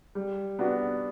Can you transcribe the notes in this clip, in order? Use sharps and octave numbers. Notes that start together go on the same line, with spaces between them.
G3
B3 D4 F#4